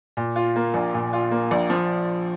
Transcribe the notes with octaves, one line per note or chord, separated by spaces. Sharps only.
A#2
F4
A#3
A#1
A#2
F4
A#3
A#1
F3